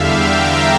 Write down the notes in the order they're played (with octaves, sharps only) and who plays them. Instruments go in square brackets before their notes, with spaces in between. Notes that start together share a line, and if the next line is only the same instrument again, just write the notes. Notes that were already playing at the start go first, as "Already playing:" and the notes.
Already playing: [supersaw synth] E2 D3 G3 E5 F5 G5
A#5